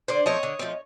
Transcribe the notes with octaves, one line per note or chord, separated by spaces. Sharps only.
D3 C5 D5
F3 A3 C4 C#5 D#5
D3
F3 A3 C4